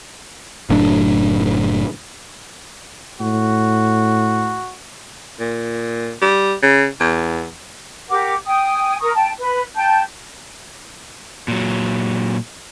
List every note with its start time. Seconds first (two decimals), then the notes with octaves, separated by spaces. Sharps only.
0.69 F#1 A2 F#3 D4
3.20 A2 F#4
5.39 A#2
6.21 G3
6.62 C#3
7.00 E2
8.09 G4 A#4 F#5 D6
8.46 G5 G#5 D#6
9.00 A#4 A#5 C#6 D#6
9.14 G5 A5
9.38 B4
9.75 G5 A5 G6
11.48 A#2 F#3